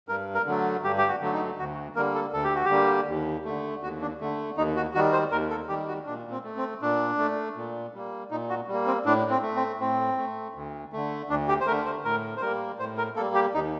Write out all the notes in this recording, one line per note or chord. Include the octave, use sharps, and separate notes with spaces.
G2 A#4
A#4
D3 F#3 A3
G2 G4
G4
F#4
D3 F#3 A3
D#4
D2 F#4
D3 G3 A#3 A#4
A4
D2 A4
G4
F#4
G4
D3 G3 A#3
D#2
D3 A3
D#2 F#4
D4
D3 A3
D#2 D#4
F#4
D#3 G3 F#4
C5
D#2 A#4
A4
D#3 G3 G4
F#4
A#2 D4
C4
A3
C4
A#2 D4
A3
A#2
G3 A#3
A#2 D#4
F#4
G3
A#3
C4
A2 D4
C4
A3
C4
A2 C4
A3
D2
D3 A3
D2 D4
G4
C5
D3 A3 A#4
C5
A2 A#4
C5
G3 A#3 A#4
A2 C5
A#4
G3 A#3 A4
G4
D#2 D#4